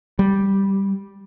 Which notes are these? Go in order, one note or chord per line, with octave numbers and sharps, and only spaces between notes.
G3